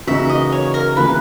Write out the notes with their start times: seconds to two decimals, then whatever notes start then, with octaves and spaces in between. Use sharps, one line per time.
0.07 C#3 E3 A#3 D#4 F#4 E5
0.29 D#5
0.52 C#5
0.74 A#4
0.97 C#3 E3 A#3 B4